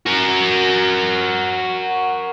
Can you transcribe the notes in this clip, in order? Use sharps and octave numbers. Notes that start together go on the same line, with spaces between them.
F#4 A#4